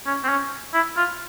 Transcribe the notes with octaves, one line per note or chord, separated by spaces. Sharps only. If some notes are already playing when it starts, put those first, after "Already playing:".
C#4
C4
C#4
E4
F4